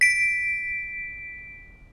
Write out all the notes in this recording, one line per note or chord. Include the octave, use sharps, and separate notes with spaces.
B6 D7